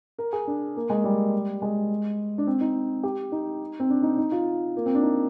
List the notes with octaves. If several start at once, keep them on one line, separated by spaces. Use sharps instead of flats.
A#4
G#4
D4
A#3
G#3
G3
G#3
D4
C4
D#4
G4
D#4
C4
D4
D#4
D#4
F4
A#3
C4
D4
D#4